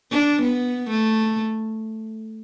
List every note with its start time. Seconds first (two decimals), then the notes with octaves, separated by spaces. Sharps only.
0.11 D4
0.42 B3
0.90 A3